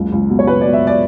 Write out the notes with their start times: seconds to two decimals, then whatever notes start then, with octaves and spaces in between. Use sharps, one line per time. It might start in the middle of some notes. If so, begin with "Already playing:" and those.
Already playing: F#1 C#2
0.12 C#2
0.30 B2
0.39 C#5
0.47 C#2 B4
0.61 D5
0.65 B2
0.73 E5
0.87 D5